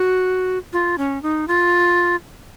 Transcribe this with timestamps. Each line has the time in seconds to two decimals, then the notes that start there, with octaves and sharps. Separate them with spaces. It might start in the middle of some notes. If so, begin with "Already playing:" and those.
Already playing: F#4
0.73 F4
0.98 C#4
1.23 D#4
1.48 F4